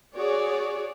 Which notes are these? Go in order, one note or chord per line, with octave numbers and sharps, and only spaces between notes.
F#4 G#4 C#5 D5